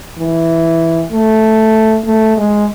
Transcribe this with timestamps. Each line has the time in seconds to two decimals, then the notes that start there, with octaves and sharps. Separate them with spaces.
0.18 E3
1.12 A3
2.05 A3
2.37 G#3